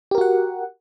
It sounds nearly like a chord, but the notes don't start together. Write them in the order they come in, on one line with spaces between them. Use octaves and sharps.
G4 A#4 F#4 F#5